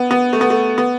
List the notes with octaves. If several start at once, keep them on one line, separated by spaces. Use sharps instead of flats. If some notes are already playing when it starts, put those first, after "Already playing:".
Already playing: B3
B3
A3
B3
A3
B3